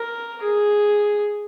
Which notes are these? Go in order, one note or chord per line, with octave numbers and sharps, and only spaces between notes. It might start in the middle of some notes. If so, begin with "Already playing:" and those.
Already playing: A#4
G#4